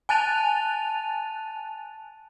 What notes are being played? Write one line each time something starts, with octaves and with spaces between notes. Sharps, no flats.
G#5 A5 F#6 A6 D#7 F7